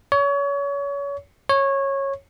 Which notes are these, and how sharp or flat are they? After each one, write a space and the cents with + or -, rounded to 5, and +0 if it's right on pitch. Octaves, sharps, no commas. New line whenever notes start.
C#5 +30
C#5 -15